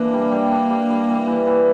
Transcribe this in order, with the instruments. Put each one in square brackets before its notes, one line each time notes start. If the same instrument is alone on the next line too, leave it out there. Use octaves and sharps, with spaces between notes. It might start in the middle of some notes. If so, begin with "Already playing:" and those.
Already playing: [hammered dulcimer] E3 D4 [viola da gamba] A#3
[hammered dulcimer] G3
G3
D4
G3
G3
E3
E3
E3